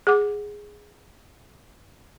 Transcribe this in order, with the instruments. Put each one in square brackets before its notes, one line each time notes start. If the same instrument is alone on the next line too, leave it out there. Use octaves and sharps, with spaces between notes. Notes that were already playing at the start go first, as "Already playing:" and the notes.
[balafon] G#4 F#5 D6